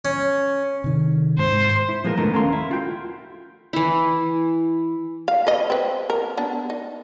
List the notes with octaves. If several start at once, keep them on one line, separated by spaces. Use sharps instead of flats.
C#4
C3 D#3
G#2 C5
E4
A#2 F3 G#3 B3 A#4
D3 G#3 A3 B3 A#4 A#5
D#2 C#4 A4 A#4 F5 C6
E4 F5
F4 F#4 G5 C6
E3 E4
F5
B4 D#5
C4 B4
A#4
B3 D4
D#4